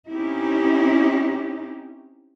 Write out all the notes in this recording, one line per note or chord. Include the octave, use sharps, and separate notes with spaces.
C4 C#4 D#4 E4 G4